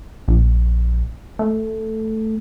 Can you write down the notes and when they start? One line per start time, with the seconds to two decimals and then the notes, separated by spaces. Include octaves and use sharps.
0.28 A#1
1.39 A3